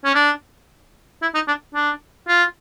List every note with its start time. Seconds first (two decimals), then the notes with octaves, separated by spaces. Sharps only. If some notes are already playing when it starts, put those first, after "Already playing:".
0.05 C#4
0.15 D4
1.22 E4
1.35 D#4
1.48 D4
1.75 D4
2.28 F4